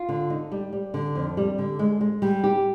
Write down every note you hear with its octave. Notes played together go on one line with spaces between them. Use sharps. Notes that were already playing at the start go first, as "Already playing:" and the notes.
Already playing: F4
D3
D#4
G3
G3
D3
F2
G3
D3
G#3
G#3
G3
G4